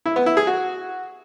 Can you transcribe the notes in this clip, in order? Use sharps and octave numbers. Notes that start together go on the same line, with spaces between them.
E4
B3
E4
G#4
F#4